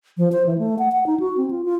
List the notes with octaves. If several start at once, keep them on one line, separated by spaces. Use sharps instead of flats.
F3
C5
E3
A3
F#5
F#5
D#4
F#4
C4
F4
F4